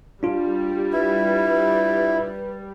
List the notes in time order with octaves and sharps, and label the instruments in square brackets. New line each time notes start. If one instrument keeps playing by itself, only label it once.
[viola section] G3 [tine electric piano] D4 F4
[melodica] E4 [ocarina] B4